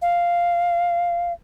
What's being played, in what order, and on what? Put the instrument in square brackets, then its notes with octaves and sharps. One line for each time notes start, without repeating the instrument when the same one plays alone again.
[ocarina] F5